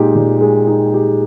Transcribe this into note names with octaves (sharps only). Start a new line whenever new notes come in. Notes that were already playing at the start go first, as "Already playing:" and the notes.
Already playing: A#2 G#3 D#4 G4
A#2
G#3
D#4
G4